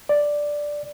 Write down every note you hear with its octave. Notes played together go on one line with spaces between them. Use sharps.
D5